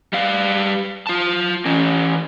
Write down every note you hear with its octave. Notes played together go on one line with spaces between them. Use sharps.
G3 F5
F4 A5
E3 C#4